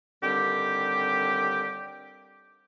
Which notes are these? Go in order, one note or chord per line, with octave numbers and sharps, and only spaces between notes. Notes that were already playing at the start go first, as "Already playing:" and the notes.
D#2 D3 G3 C4 G4